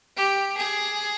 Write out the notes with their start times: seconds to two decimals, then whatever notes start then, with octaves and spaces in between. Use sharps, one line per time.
0.17 G4
0.57 G#4